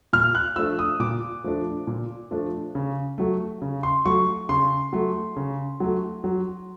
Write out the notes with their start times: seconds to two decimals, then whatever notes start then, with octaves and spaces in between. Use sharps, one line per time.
0.13 A#2 F6
0.35 F#6
0.56 F3 A3 D4 E6
0.79 D#6
1.00 A#2 D6
1.44 F3 A3 D4
1.87 A#2
2.31 F3 A3 D4
2.75 C#3
3.18 F#3 A3
3.62 C#3
3.83 C6
4.06 F#3 A3 C#6
4.49 C#3 C6
4.93 F#3 A3
5.36 C#3
5.80 F#3 A3
6.24 F#3